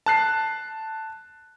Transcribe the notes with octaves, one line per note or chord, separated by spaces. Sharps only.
A5 F#6 C7